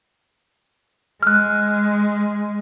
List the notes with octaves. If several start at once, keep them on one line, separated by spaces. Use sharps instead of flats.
G#3 F6 F#6